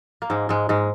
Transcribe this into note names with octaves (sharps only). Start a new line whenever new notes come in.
A#3
G#2 G#3
G#2 G#3
G#2 G#3